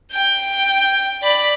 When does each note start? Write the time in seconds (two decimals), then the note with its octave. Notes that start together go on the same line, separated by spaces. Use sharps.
0.13 G5 G6
1.22 D5 B5